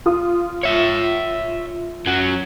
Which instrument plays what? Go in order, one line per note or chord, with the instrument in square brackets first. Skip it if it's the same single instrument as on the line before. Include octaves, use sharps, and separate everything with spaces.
[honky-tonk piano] F4 D#6
[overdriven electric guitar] C#5 E5
F#2 F#3